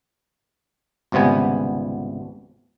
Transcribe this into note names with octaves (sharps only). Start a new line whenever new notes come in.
G#1 C#2 C3 G3 B3 G#5